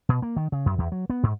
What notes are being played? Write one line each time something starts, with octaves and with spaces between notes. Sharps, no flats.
B2
A#3
D#3
C#3
F#2
E2
F#3
B3
G#2